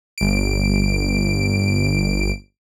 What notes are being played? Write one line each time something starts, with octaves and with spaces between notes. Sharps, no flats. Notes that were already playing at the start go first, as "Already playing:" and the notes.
G1 D7